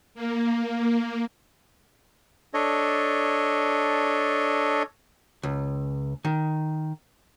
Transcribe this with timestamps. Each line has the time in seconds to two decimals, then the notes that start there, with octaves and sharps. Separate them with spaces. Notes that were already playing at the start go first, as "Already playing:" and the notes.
0.15 A#3
2.54 D4 A4 C#5 D#5
5.43 C#2
6.25 D#3